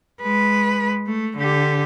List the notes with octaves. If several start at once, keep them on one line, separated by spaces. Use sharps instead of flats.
G#3 B4
A3
D3 G4